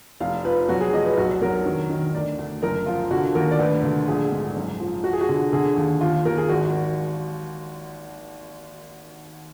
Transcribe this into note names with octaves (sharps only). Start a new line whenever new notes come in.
F1 F5
F3 B4
F#3 F#4
G#4
F1 D#5
B4
B1 F#4
F#3 A#4
D#3
D#3
D2 D5
D2
F#1 A#4
F3 F4
D3 F#4
D#2 A#4
D5
D2 B4
D3
A#1 G#4
G#2
F#1
F3
F3 F#4
G#4
F#4
D3
D3 G#4
D#2
D#2 F4
D#2 A#4
G#4
G#1 F#4